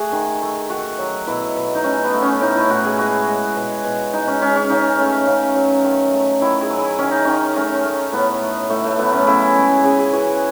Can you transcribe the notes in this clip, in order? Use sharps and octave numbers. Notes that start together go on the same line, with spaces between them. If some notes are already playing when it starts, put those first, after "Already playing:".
Already playing: A3 F#4 G#4
D#3
A3
D#3 F#4
F#3
B2 E4
B2
D#4
A3 C#4
B3
A3
C#4
A2 D#4
E4
A2 F#4
G#4
G#3 F#4
G#3
B2
B2
G#3 D#4
C#4
G#3 C#4
C#4
C#3 D#4
A3
C#3
F#3
D#3
A3
D#3 E4
G#4
F#3
E4
D#3 C#4
D#4
D#3 C#4
A3 C#4
A3
A2 B3
A3
A2 A3
A3
F#3 B3
C#4
C#3 E4
G#3
C#3 G#4
G#4
E3 F#4